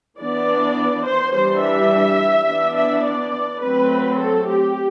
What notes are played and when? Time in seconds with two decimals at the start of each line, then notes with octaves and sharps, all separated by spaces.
0.19 E3 B3 D4 D5
1.04 C5
1.33 E3 G3 D4 C5
1.61 E5
2.47 E3 B3 D4
2.75 E5
3.04 D5
3.61 F#3 A3 C4 B4
4.18 A4
4.47 G4